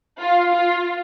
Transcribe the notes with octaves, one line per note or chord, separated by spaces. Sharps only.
F4
F4